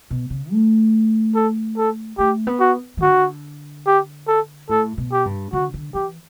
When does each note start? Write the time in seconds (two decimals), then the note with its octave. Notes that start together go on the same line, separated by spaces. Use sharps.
0.10 B2
0.30 C#3
0.51 A3
1.35 A4
1.77 A4
2.18 A3 G4
2.47 B3
2.60 F#4
2.97 E3
3.02 D3 F#4
3.87 G4
4.28 A4
4.69 A2 A4
4.98 B2
5.12 G4
5.26 G2
5.53 D3 F#4
5.74 D3
5.94 E3 G4